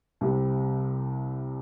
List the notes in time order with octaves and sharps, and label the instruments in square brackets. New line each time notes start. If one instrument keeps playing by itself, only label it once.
[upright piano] C2 C3 G3 C4